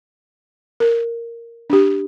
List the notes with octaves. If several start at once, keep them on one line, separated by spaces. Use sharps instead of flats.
A#4
D4 G4